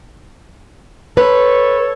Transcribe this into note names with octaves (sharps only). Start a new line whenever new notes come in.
A4 B4 C#5